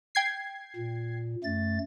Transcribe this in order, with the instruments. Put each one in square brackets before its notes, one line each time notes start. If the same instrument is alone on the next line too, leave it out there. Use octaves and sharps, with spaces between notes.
[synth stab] G5 G#6 C7
[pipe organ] A#2
F#2 A3 A6